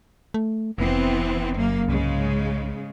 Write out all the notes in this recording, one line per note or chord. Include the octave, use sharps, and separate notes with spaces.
A3
F1 E3 B3 C4
F#2 C#3 A#3
C2 G#2 C#3 G#3